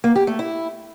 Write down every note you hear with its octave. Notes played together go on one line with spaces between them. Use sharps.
A#3
G4
A3
E4